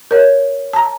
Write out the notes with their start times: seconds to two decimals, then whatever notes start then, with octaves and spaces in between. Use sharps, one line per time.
0.11 A#4 C#5
0.73 A5 A#5